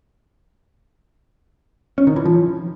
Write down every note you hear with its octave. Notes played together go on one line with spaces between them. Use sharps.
C#4
D#3
E3
F3